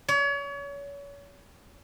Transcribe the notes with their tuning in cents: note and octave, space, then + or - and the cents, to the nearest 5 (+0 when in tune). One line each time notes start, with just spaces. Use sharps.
C#5 +35